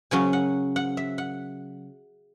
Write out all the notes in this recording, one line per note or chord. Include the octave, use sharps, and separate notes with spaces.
C#3 F#3 C#4 G#5
F#5
F#5
E5
F#5